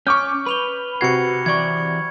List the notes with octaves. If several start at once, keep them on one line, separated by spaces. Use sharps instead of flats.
C#4 C#6 D6 F6 G6
B4 B5 F7 G7
C3 F#4 G#6 C7 C#7
E3 D5 C#6 G#6